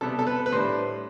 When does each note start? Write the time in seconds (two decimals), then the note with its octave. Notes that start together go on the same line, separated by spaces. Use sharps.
0.01 C3 G3 B3 A4
0.19 A4
0.27 B4
0.46 B4
0.52 A2 G3 D4 C5